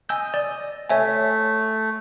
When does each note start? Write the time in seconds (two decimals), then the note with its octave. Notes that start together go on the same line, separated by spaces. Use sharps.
0.09 D#5 G#5 E6 G6
0.34 D5
0.89 A3 C#5 E5 G#5